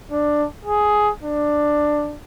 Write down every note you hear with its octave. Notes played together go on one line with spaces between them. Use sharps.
D4
G#4
D4